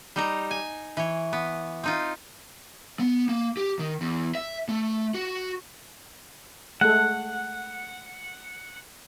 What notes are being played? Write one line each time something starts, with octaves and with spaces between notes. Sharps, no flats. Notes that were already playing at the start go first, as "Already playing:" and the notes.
G3 D#4 A#5
G#5
E3 C#5
B3
C4 D#4 F4
B3
A#3
G4
D#3
E2
E5
A3
F#4
G#3 A3 A4 F#5